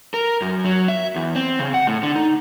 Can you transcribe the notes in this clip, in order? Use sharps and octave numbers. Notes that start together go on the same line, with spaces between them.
A#4
F#2
F#3
E5
E2
C4
C#3
F#5
A2
D3
D#4